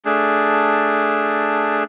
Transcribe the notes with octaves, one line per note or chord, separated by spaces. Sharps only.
A3 D4 G#4